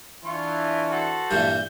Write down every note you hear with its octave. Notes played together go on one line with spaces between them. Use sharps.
E3 D4 F4 C#6
F#4 A4 C5
G2 A#2 E3 G6